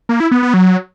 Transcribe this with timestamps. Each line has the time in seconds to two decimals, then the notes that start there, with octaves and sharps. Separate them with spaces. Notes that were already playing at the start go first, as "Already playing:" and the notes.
0.09 A#3
0.20 E4
0.31 B3
0.43 B3
0.54 F#3